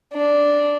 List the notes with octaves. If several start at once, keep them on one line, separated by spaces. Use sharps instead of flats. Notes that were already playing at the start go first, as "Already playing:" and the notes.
D4